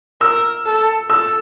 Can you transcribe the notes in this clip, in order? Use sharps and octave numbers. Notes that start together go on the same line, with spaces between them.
A#4 E6
A4
A4 E6